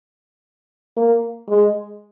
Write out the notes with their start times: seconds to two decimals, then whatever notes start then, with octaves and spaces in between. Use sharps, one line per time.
0.97 A#3
1.49 G#3